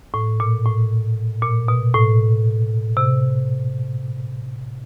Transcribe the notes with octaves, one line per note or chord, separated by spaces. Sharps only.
A2
A#2
A2
A#2
B2
A2
C3